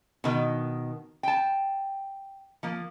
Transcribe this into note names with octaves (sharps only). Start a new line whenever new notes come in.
B2 D#3
G5 A5
F3 A#3